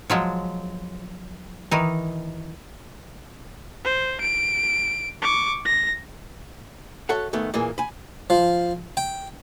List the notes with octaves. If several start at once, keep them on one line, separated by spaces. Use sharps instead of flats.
F3 F#3 G#3
D#3 E3 D#4
C5
D7
C#6 D6
A#6
F#4 A4 C#5 E5 F#5
G#2 D#3 A3 B3
A#2 E3 A#3 G#4
G#5 B5
F3
G5